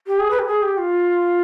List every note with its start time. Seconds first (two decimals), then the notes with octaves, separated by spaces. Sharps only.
0.07 G4
0.19 G#4
0.31 B4
0.39 G4
0.46 G#4
0.62 G4
0.78 F4